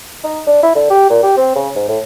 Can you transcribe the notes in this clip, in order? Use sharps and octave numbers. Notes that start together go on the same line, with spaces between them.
D#4
D4
E4
D3
G4
A#2
G4
C4
C#3
G#2
A2